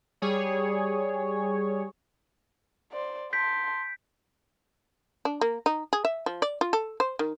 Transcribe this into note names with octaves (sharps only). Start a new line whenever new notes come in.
G3 G#4 C#5
C5 D5
A5 C6 G6 B6 D7
D4
A#3
D#4
G#4
E5
F3
D5
F4
A4
C5
D#3